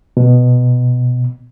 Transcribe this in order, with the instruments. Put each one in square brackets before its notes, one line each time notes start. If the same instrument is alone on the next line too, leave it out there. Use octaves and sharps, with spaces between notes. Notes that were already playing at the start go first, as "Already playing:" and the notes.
[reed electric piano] B2